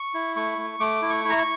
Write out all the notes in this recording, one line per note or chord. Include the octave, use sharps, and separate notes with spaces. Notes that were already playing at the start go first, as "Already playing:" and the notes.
Already playing: C#6
E4
A3 C#6
A3
A3 D6
E4
C#6
E4
A#5
C#6